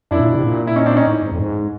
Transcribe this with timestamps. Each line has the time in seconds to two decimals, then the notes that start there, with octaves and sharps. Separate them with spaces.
0.11 F#2 D4 E4
0.20 A#2
0.27 B2
0.35 C3
0.44 A#2
0.67 E4
0.76 C#4 D#4
0.86 C4 D4
0.96 C#4 D#4
1.07 A2
1.23 G#2
1.32 F2
1.39 G#2